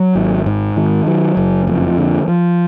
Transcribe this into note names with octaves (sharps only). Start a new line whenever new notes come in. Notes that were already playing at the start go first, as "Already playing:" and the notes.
Already playing: F#3
G#1
G#2
D#3
F#3
F#1
F2
D3
F3